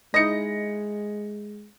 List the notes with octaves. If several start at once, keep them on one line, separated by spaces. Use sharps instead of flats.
G#3 D#4 E4 D#5 A#6 C#7